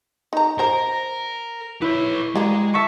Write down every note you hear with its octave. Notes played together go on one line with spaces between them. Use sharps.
D#4 A#5
A#4 C5 A#5
E4 B4 C#5
G3 G#3 A#3
E5 A5 C#6